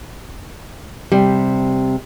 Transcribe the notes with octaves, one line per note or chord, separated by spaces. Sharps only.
C3 G3